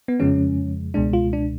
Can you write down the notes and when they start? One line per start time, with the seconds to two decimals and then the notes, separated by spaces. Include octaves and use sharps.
0.08 B3
0.20 F2 C#3 F3 G#3 C#4
0.94 C#2 B2 G#3 D4
1.13 F4
1.33 D4